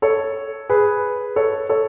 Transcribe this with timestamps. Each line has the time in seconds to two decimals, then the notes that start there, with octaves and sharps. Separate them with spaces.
0.02 A4 C#5
0.69 G#4 B4
1.36 A4 C#5
1.69 A4 C#5